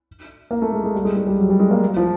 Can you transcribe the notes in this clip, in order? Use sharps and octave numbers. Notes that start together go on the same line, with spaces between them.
A#3
A3
G#3
G#3
G3
G#3
G#3
G3
F#3
G3
G#3
A#3
F3